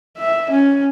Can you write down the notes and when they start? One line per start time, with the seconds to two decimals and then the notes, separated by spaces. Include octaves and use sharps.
0.18 E5
0.50 C#4